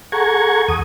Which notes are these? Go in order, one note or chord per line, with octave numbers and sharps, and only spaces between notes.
G#4 A4 F#5 A#5 C#6 G#6
E2 D#6